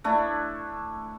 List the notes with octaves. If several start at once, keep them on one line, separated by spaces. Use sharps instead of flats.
A3 D4 E4